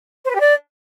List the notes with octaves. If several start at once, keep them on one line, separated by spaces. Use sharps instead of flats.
C5
B4
G4
D5